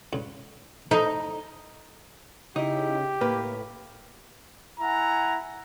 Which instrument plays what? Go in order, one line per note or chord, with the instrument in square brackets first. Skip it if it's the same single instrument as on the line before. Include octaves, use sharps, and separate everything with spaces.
[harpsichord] C#2 G2
[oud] D#4 [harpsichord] A4
[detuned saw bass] C#3 [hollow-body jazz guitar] D#4 E4 [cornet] G4
[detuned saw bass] A2 [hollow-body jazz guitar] A#3 [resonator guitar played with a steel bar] B4
[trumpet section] E4 F#5 G#5 A#5